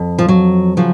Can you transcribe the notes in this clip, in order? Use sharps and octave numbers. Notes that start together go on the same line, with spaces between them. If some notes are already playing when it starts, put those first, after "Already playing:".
Already playing: F2
F3
F#3
C#3 F3 F#3